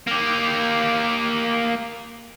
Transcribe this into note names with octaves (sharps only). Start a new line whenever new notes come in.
A#3 G4